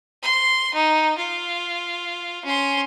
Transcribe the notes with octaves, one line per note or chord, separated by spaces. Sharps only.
C6
D#4
F4
C#4 C6